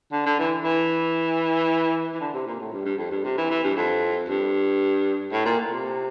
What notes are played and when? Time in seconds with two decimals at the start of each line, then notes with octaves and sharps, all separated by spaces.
0.12 D3
0.26 D3
0.39 E3
0.64 E3
2.14 E3
2.20 D3
2.33 C3
2.46 A#2
2.60 A2
2.72 G2
2.85 G2
2.98 F2
3.11 G2
3.24 C3
3.37 E3
3.50 E3
3.63 G2
3.76 F2
4.28 G2
5.32 A2
5.45 A#2
5.71 C3